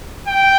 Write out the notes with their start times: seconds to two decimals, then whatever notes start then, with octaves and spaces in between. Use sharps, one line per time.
0.28 G5